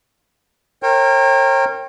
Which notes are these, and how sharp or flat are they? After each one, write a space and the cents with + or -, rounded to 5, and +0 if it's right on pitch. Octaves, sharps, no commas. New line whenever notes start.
A#4 -20 C#5 -40 G5 +0